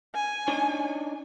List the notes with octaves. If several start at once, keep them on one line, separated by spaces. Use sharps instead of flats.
G#5
D4 D#4 C#5